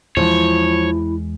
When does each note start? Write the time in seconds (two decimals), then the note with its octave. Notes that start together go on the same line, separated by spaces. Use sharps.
0.17 E2 E3 F3 G#3 E4 C#5